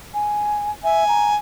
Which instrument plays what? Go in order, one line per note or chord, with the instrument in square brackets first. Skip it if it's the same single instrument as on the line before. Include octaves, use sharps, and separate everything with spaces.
[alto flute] G#5
[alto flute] E5 [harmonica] G#5
[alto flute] A#5